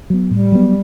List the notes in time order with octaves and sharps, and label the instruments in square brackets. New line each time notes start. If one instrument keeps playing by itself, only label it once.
[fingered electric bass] F#3 B3
[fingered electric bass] A2 [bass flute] G3
[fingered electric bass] F#3 B3